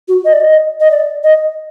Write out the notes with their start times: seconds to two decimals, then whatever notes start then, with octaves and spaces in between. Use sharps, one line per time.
0.08 F#4
0.25 D#5
0.33 D5
0.40 D#5
0.80 D#5
0.91 D5
1.24 D#5